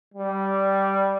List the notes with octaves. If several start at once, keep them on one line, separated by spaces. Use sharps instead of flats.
G3